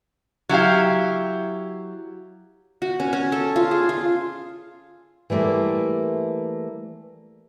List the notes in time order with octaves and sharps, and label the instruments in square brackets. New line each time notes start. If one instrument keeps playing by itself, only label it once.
[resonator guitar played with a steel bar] F#3 E4 G4 F5
[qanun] F#4
C#4
C#4
A4
F4
G#4
F4
[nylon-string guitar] E3 G3 A3 A#3 C5